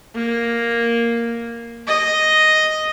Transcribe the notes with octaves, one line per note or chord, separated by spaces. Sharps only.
A#3
D#5